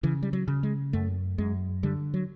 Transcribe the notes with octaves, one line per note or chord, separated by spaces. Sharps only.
C#3 E3
G3
F#3
C#3
G#3
F#2 A3
F#2 G#3
D3 G3
F#3